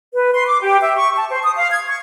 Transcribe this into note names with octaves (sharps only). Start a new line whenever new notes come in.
B4
C6
D6
G4
E5
C#6
A5
C5
D#6
F5
G#6
C#6